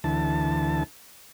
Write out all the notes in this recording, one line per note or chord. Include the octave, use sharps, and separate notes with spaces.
D2 E3 A5